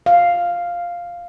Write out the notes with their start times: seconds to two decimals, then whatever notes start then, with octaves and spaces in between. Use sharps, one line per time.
0.06 F5